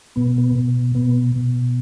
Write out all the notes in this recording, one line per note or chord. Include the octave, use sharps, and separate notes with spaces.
B2 B3
B3
B2
B2 B3
B2